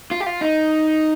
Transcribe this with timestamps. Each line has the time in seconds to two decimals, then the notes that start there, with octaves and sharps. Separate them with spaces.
0.11 F4
0.20 G4
0.26 F4
0.41 D#4